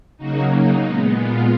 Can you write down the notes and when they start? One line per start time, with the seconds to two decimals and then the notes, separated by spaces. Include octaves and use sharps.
0.17 C#3 F#3 A#3 D#4 F#4
0.51 D#4
0.82 A#2 G#3 B3
1.15 F4